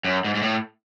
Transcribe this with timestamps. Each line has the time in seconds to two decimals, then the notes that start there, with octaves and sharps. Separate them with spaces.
0.04 F#2
0.24 G#2
0.35 G#2
0.42 A2